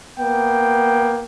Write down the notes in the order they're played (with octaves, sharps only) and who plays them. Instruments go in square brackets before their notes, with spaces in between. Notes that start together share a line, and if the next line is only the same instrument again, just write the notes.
[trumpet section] A#3 B3 G5